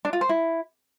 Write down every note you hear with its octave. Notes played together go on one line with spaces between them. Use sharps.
D4
F4
C5
E4